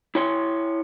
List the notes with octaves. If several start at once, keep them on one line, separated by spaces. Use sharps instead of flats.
E4 C#5 C6